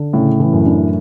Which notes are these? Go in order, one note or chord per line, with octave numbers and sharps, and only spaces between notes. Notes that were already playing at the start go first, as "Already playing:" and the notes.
Already playing: D3
A2 C#3
E3
F#2
D4